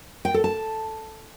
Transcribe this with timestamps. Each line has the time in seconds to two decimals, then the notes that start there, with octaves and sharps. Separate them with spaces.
0.25 G5
0.34 A4
0.44 A5